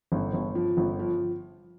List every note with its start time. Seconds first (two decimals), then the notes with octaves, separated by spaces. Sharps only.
0.12 G1
0.33 G1
0.55 F3
0.77 G1
0.99 F3